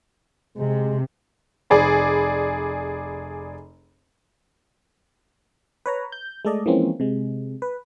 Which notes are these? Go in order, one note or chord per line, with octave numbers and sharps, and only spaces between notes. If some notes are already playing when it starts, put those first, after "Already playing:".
C3 G#3
F1 G#4 D5 B5
B4 C#5 A#5
G6
G#3 A3 A4 D5 D#5
E3 F3 G#3 A#3 C4 C#4
C3 G#3
B4